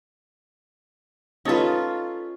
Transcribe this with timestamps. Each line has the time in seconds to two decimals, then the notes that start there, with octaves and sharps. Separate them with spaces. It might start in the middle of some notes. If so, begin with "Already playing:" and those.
1.45 C#4 D#4 F4 A4 B4